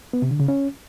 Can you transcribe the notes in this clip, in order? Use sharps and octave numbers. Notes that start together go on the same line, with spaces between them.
B3
C3
D3
C#3
C#4